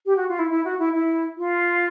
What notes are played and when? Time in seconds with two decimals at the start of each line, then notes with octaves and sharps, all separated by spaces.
0.06 G4
0.17 F#4
0.29 F4
0.39 E4
0.51 E4
0.65 F#4
0.79 E4
0.94 E4
1.38 F4